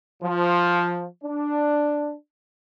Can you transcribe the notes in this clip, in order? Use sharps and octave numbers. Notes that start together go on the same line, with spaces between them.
F3
D4